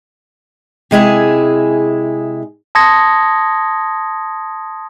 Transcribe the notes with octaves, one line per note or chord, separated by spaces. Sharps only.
C3 G#3 E4 G#4
A5 C6 D#6 G#6 A#6 C#7